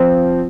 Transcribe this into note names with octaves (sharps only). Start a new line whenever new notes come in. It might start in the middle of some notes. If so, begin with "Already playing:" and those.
Already playing: F3 C4 F4